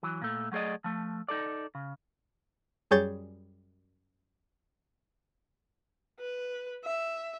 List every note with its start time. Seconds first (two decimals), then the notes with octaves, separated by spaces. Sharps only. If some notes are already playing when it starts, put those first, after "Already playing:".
0.03 E3 F#3
0.22 A#2 A3
0.52 F#3 A3 G#4 D5 D#5
0.84 F3 A3
1.28 D#4 A4 D5
1.75 C#3
2.91 F#2 G3 G#4 C#5 G6 A6
6.20 B4
6.85 E5